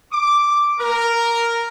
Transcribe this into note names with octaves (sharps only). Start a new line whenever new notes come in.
D6
A#4